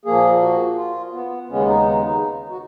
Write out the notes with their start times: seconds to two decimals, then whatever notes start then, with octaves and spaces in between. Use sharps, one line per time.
0.05 A#2 F3 A#3 G#4
0.42 F#4
0.77 F4
1.14 B3
1.49 D#2 C#3 G#3 B3 C#4
1.68 D#4
1.86 D#4
2.04 D#4
2.50 F#4